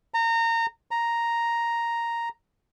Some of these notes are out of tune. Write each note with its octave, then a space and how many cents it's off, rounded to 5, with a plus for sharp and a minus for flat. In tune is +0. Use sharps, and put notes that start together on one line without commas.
A#5 -25
A#5 +0